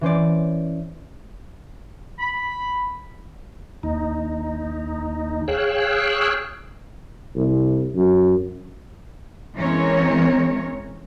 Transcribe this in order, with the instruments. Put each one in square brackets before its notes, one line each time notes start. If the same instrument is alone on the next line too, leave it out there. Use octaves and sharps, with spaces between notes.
[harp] E3 C#4 C5 D5
[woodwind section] B5
[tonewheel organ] D#2 D#4
G#4 C#5 F5 G5 E6 F#6
[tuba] C2
F#2
[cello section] E3 G#3 C4 C#4 A#4 C#5